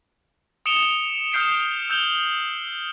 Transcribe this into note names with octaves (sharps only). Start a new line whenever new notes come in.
D#6 C#7 D7 E7 F7 G7
D#6 F6 G6 C7 D7 E7
E6 G6 F7 G7